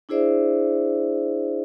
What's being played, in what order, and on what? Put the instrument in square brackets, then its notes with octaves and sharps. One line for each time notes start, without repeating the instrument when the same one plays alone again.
[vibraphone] D4 E4 G#4 C5 D5 E5